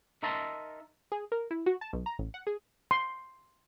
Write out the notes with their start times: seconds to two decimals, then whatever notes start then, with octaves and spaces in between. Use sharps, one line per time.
0.23 D#4 A#4 E5 A5 A#5 C6
1.12 G#4
1.32 A#4
1.51 E4
1.66 F#4
1.81 A5
1.93 B1
2.06 A#5
2.19 A1
2.34 F#5
2.47 G#4
2.91 C6